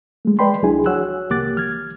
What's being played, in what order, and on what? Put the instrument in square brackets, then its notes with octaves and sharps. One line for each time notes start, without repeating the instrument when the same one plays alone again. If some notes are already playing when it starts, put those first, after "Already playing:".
[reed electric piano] G#3 A3
B4 D5 D#5 G5 B5 C6
C#2 F#3 D4 E4 G#4 G#5
F#4 C#5 F#5 G#5 E6 F#6
C2 A#3 G4 D6 F#6 A6
F6 G#6